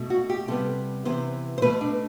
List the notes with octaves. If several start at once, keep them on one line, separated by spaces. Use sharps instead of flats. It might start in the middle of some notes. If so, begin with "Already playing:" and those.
Already playing: B2 A3
F#4
G4
C3 G3 B3 A4
C3 E3 B3 C5
C5
B2 A3 B4
D4